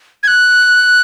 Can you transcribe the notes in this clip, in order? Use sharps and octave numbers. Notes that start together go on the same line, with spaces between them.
G#6
F#6